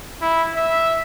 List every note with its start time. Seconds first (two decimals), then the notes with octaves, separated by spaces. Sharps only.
0.21 E4
0.56 E5